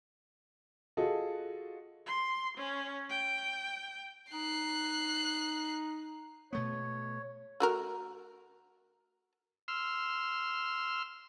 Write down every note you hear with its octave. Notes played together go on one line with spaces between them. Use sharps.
F4 F#4 G#4 A4 D#5
C6
C#4
G5
D#4 F#6 C7
B2 A3 B3 C#5
A3 F#4 A#4
C6 E6 F6